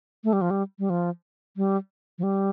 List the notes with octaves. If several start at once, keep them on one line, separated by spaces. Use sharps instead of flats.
A3
G3
F3
G3
G3
F3
G3
F3
G3